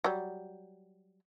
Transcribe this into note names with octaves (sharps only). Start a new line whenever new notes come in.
F#3 G3